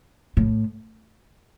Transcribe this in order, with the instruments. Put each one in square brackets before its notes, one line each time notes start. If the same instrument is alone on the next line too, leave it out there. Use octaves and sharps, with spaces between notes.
[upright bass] A2